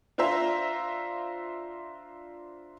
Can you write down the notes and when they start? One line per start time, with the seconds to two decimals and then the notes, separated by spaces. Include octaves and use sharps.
0.18 D4 F4 C5 E5 A#5